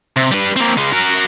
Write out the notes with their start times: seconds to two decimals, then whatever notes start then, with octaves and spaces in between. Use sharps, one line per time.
0.16 C3
0.31 G3 B4
0.56 A#3 C4
0.77 C#3 G#3
0.93 F#4 A#4